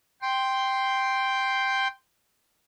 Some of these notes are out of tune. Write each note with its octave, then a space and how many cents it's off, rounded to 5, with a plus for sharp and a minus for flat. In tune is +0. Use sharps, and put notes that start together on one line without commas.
G5 +0 C6 +0